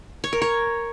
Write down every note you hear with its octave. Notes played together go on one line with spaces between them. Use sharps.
C#5
A#4
C#5